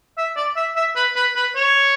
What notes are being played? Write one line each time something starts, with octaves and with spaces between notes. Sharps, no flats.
E5
D5
E5
E5
B4
B4
B4
C#5